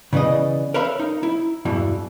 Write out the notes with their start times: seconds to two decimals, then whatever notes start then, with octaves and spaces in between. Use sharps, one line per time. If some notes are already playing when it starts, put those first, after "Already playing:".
0.13 C#3 E3 B3 D5 D#5
0.74 A#4 B4 C#5 E5 F5 B5
0.99 D#4
1.23 E4
1.65 E2 G2 B2 E3